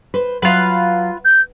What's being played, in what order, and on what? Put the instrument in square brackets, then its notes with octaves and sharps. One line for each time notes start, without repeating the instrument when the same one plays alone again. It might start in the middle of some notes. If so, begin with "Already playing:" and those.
[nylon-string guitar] B4 C5
[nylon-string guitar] F#3 [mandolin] F4 B4
[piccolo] G6